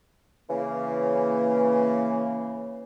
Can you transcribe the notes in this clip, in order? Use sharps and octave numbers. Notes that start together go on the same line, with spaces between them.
C#3 E3 A#3